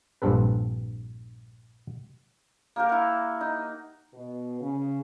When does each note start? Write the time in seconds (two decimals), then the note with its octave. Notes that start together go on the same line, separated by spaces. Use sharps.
0.22 A#1 G2 C4 A4 B4
2.76 A#3 G4 A#4
2.89 E4 F#5
3.41 D#4
4.14 B2
4.61 C#3